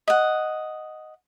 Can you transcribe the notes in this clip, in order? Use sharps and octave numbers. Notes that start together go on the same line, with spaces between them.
D#5 F#5